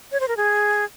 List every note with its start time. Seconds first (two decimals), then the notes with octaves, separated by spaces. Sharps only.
0.12 C#5
0.20 C5
0.28 A#4
0.37 G#4